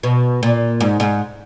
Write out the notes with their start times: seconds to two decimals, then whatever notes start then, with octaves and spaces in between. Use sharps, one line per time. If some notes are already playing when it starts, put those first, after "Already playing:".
0.03 B2
0.43 A#2
0.80 G#2
1.00 G#2